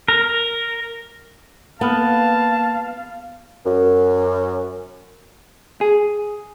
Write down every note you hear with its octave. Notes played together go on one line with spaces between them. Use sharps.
A#4
A#3 B3 F5 A5 F6
F#2
G#4